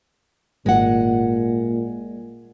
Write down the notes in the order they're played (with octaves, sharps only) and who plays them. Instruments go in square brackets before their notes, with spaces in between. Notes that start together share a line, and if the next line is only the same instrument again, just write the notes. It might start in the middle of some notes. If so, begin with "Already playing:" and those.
[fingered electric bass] G#1 [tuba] A#2 [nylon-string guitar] G#3 F#5